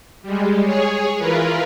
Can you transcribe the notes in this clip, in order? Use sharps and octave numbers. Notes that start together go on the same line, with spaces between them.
G3 G#3
G#4 C#5
E3 F4 A#4 B4